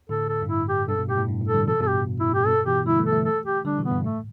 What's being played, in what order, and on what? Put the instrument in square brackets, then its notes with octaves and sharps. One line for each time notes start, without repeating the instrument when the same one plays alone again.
[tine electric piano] A2 D3 [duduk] A4
[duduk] A4
[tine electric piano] G2
[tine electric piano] A2 [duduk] E4
[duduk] G4
[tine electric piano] G2 B2 [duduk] A4
[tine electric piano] G2 B2
[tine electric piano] A2 [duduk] G4
[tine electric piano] A2
G2
A2
[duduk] A4
[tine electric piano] D3 G3
[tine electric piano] B2 E3 [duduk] A4
[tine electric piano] G2 B2 [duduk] A4
[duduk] G4
[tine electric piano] A2
[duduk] E4
[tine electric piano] A2
[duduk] G4
[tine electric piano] G2 B2 [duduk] A4
[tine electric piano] B2 E3 [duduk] G4
[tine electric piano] D3 G3 [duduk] E4
[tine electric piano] E3 A3
[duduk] A4
[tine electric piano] E3 A3
[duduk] A4
G4
[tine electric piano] D3 G3 [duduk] D4
[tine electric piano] B2 E3
[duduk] B3
[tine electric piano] G2
[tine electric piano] A2 [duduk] A3